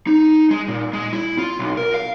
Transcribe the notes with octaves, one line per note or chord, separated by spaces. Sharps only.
D#4
G#3
A#2
G#3
E4
F4
B1
A#4
F5